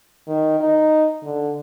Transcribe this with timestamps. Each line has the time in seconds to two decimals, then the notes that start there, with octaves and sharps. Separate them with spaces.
0.27 D#3
0.60 D#4
1.23 D3